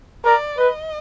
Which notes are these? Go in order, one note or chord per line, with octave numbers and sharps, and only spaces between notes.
A#4 D5
B4 D#5